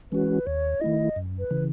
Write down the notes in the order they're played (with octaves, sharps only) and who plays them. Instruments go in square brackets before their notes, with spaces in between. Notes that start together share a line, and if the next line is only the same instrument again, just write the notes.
[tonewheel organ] E3 G#3 C#4 F#4 [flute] B4
[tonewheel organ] D#2 [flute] C#5
[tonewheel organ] D#3 A3 E4 [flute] D#5
[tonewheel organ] F#2
[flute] B4
[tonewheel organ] C#3 E3